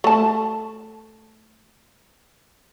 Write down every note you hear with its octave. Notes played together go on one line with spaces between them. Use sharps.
A3 A5